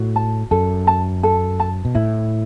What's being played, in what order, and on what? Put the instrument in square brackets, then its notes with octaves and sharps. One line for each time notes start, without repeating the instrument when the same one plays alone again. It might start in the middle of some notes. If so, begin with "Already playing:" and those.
Already playing: [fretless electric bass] A2 [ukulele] F#4
[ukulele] A5
[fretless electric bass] F#2 [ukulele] A4
[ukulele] A5
A4
A5
[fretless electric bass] B2
[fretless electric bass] A2 [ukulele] E4